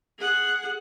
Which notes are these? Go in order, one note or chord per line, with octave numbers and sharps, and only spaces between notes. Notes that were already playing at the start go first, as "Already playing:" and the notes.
G#4 F#5